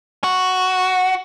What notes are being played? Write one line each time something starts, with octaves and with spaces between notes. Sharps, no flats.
F#4